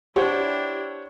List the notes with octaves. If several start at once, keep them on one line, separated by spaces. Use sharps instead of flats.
D4 E4 G4 C5 C#5 F#5